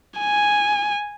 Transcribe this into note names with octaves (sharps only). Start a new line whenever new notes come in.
G#5